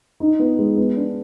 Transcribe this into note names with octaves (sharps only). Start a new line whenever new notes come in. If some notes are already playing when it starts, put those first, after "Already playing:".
D#4
B3
G#3
B3
D4